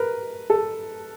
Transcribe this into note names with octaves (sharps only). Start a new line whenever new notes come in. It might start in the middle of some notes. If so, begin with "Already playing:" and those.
Already playing: A#4 B4
A4